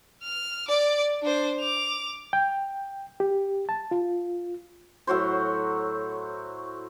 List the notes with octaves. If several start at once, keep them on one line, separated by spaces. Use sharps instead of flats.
F6
D5 D6
D4 C5
D6 F7
G5
G4
A5
F4
A2 F#3 F#4 C5